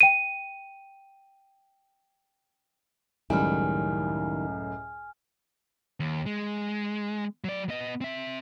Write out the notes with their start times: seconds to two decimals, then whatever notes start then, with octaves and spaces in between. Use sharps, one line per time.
0.01 G5 D#7
3.30 C#2 F#2 A2 D#3 G3 E4 G#5 F6
6.00 D#2
6.26 G#3
7.44 F#3 D5
7.69 B3 D#5
8.01 C4 E5